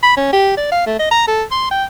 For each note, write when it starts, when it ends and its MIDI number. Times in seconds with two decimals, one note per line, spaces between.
0.03 0.15 83
0.17 0.28 61
0.33 0.53 67
0.57 0.68 74
0.72 0.84 77
0.86 0.94 57
0.99 1.08 75
1.11 1.23 82
1.28 1.43 69
1.51 1.67 84
1.71 1.84 79